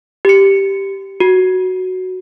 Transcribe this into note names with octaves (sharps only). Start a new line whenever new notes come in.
G4 C#7
F#4